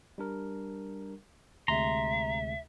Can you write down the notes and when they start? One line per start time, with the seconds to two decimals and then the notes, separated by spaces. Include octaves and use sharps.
0.18 G3 D4 A#4
1.68 D2 C3 G#3 E5 A#5 C6